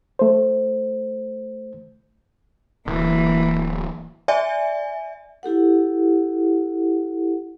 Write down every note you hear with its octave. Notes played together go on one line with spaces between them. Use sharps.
A3 C5
D1 E3 A#3
D5 E5 G#5
E4 G4 A4 F#5